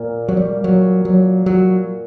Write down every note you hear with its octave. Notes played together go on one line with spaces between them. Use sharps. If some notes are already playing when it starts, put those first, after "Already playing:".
Already playing: A#2 A#3
F#3
G3
F#3
F#3
F#3